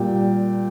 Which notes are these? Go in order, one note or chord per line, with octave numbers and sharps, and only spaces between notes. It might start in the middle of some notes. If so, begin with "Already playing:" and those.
Already playing: A#2 G3 G5